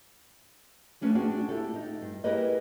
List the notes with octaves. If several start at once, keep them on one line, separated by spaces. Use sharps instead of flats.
A3 B3 C#4 D4 G#4
C4 D4 F#4 G#4
E4 G4 A4
D#4
G2
E4 G4 G#4 A#4 B4 D#5